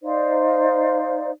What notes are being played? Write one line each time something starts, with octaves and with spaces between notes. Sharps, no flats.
D#4 C5 D5 F5